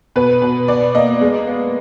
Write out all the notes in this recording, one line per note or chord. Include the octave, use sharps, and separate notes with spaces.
B2 B4
B2
B2 D5
A#3 D#5
G#3
B3